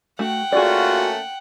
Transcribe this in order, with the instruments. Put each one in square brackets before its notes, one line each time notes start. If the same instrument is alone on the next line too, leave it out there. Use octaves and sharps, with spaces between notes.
[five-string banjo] A3 F#4 [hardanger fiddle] F#5 G5
[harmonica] A3 A#3 C#4 [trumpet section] F4 F#4 [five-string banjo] G#4 D5